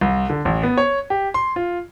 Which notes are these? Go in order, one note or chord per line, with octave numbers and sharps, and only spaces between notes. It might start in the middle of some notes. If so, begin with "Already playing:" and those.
C2
D3
A1
B3
C#5
G4
C6
F4